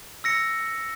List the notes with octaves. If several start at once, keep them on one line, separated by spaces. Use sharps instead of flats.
E6 A#6 C#7